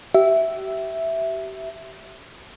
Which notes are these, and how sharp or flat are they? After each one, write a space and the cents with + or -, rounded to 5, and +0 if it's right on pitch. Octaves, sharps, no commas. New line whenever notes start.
G4 -35 E5 +0